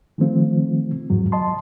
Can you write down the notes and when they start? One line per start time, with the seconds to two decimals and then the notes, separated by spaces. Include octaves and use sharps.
0.18 D#3 F3 A3 C4 F4
1.10 E2 G#2 F#3
1.32 D#5 A5 C6